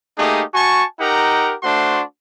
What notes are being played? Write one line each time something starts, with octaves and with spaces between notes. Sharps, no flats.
A3 A#3 D#4 G4 G#4
F#4 G#5 A5 C#6
D#4 G4 A#4 F#5 A#5
A3 D4 F#4 C5 C6